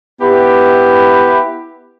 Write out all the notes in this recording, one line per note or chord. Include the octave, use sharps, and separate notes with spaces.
B3 E4 G4